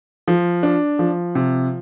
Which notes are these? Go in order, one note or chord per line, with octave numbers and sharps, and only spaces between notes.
F3
D4
F3
C3